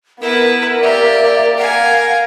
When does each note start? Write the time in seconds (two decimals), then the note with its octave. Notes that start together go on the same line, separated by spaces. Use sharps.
0.21 B3 E4 A#4 B4
0.82 A#3 G4 D5 E5
1.58 A#4 F5 F#5 G#5